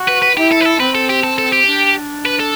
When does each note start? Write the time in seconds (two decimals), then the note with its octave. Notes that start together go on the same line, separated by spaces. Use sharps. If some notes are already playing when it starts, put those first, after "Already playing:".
Already playing: F#4
0.08 B4
0.23 B4
0.36 E4 G4
0.52 A4
0.61 B4
0.66 A4
0.80 C4 B4
0.95 A4
1.10 G4
1.24 A4
1.38 A4
1.52 G4
1.67 D4
2.25 B4
2.39 A4